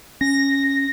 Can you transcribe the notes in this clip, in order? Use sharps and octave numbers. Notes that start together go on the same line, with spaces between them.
C#4 A#6